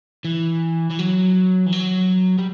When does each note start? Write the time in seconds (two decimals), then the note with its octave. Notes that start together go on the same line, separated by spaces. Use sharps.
0.25 E3
0.90 E3
0.99 F#3
1.66 E3
1.73 F#3
2.39 G3